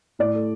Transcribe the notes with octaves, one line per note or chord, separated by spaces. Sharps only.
A2 D5
A3